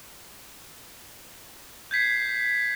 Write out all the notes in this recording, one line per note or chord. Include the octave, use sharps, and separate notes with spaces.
G6 G#6 B6 C7